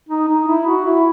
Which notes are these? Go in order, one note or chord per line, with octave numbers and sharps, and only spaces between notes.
D#4
D#4
E4
F#4
E4